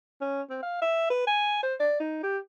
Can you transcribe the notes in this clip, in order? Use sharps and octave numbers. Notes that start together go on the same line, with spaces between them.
C#4
C4
F5
E5
B4
G#5
C5
D5
D#4
G4